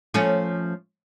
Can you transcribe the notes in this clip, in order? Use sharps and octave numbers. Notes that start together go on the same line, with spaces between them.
F3 A3 C#4